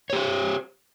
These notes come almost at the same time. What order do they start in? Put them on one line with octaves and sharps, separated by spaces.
C#5 G4 C5